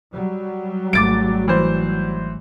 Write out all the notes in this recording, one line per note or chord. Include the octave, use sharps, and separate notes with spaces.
F#3 G3
G#1 A3 D6 A6 D7
E3 C5